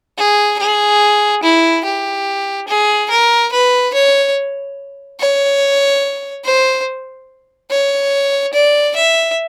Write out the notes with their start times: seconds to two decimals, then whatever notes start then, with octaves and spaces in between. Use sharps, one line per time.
0.18 G#4
0.59 G#4
1.43 E4
1.85 G4
2.68 G#4
3.10 A#4
3.53 B4
3.94 C#5
5.20 C#5
6.45 C5
7.71 C#5
8.54 D5
8.96 E5